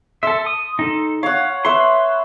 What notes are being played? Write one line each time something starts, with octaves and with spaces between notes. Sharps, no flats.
A4 E5 C6
D#6
D#4 A4
C#5 F5 F#5
B4 E5 C6